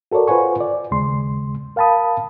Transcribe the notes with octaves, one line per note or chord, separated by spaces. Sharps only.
F#4 A4 A#4 C#5 D5
F4 B4 C5 F#5 G#5 C#6
D5
D#2 C#3 G#3 C6
A#4 F5 G5 A5 B5 D#6